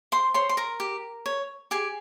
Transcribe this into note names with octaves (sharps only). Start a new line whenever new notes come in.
C5 C6
C5 C#5 C6
C6
A#4 A#5
G4
C#5
G4 G#4 G#5